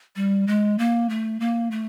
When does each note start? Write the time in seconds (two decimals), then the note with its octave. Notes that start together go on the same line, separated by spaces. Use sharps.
0.16 G3
0.47 G#3
0.79 A#3
1.09 A3
1.40 A#3
1.71 A3